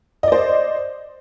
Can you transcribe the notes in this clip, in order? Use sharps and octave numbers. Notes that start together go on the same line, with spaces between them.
C5 D5 D#5